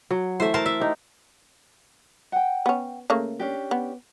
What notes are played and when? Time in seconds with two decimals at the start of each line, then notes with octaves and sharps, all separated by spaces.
0.11 F#3
0.40 E3 A3 C5 E5
0.54 A#4 C5 A5
0.66 E5
0.80 D#4 G4
2.32 F#5 G5
2.66 B3 C#4
3.10 C#3 A3 A#3
3.40 C#4 D4 G4
3.71 B3